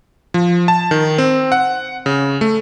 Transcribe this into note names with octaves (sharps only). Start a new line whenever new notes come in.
F3
A5
D#3
C4
F#5
C#3
A3